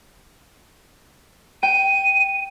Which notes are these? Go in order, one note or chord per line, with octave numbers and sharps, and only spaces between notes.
G5 D#7